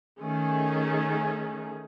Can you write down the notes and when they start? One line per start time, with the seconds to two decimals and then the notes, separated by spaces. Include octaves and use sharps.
0.19 D#3 A3 C#4 G#4